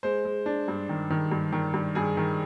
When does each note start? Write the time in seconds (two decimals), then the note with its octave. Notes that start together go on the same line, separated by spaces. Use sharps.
0.03 G#3 C5
0.25 G#3
0.46 D4
0.68 G2
0.89 D#3
1.10 D#3
1.32 G2
1.53 D#3
1.74 G2
1.95 G2 G#4
2.17 D#3